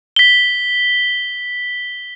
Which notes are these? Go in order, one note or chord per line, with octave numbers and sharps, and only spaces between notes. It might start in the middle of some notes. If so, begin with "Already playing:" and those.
B6 G7